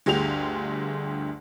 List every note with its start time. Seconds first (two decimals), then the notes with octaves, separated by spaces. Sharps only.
0.06 G1 D2 D3 G4 G#4 F7